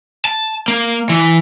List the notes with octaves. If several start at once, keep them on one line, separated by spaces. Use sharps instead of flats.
A5
A#3
E3